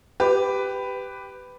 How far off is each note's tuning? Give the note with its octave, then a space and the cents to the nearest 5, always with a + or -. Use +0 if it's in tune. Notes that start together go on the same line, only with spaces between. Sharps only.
G4 +0 B4 +10